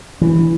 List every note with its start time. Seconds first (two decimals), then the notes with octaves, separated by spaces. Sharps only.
0.22 E3